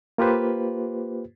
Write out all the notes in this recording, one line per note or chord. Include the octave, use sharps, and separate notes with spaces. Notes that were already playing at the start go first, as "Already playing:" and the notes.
A#3 F4 G4 B4 C5